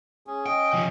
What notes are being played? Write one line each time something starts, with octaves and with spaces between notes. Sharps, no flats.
C#4 G#4
D#5 G5
C3 F3